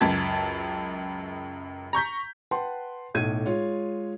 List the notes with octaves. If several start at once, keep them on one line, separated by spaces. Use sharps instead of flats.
C#2 F#2 A5 G#6 B6
A#5 C#6 G6 B6
B4 F#5 G5 A5 C6
B1 A2 G#6 D#7
G#3 F4 C#5